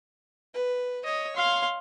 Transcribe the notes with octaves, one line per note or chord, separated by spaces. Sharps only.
B4
C#5 D#5
F5 C6